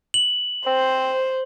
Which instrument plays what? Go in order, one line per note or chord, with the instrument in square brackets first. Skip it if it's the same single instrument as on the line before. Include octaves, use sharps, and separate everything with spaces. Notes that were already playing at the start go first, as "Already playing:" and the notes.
[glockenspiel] F#7
[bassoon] C4 [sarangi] C5